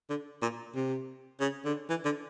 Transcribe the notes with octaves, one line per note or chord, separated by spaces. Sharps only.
D3
A#2
C3
C#3
D3
E3
D3